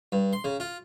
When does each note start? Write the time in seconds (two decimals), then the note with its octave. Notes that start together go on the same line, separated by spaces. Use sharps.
0.12 G2
0.33 C6
0.44 C#3
0.60 F4